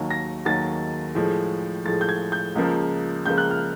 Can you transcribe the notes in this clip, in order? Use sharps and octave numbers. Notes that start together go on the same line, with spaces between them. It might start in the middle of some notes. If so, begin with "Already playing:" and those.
Already playing: D#2 D#3 F#3
A#6
D#2 D#3 F#3 A6
A2 F3 G#3
A2 F3 G#3 A6
G6
G#6
G6
C#2 C#3 F3 A#3
C#2 C#3 F3 A#3 G6
F#6
F6